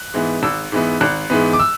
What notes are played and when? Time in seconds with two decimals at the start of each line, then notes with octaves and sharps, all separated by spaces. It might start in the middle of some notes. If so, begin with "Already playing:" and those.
Already playing: F#6
0.14 G#2 E3 B3
0.43 G#1 E6
0.72 G#2 E3 B3
1.01 G#1 F#6
1.30 G#2 E3 B3
1.53 D6
1.59 E6